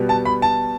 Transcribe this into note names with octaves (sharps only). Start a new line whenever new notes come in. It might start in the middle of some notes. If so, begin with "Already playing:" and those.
Already playing: B2 G3 B3
A5
B5
A5